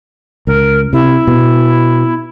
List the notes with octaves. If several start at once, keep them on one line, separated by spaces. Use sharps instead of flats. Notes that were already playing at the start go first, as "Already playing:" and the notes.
C#2 A#4
C3 E4
B2